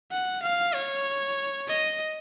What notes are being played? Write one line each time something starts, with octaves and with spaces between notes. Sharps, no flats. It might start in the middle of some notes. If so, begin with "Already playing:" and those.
F#5
F5
C#5
D#5